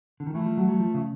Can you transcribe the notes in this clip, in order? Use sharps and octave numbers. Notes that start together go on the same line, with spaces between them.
D3
D#3
E3 A3
F3
F#3
F#3
F3
C#3